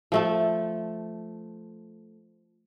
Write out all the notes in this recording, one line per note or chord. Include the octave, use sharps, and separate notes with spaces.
F3 A3 A4